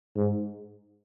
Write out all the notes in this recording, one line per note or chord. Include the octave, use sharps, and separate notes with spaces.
G#2